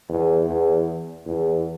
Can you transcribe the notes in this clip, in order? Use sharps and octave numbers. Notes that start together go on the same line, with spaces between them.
E2
E2
E2